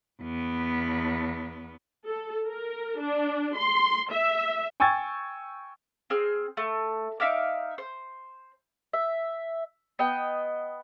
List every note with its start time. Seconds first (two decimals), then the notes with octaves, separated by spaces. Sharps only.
0.21 E2 B3
2.06 A4
2.47 A#4
2.99 D4
3.56 C6
4.13 E5
4.80 G5 G#5 C#6 E6 G#6 A6
6.10 C4 G#4 F6
6.57 A3
7.20 D#4 E5 F5 D6
7.78 C5
8.93 E5
9.99 B3 D#5 G5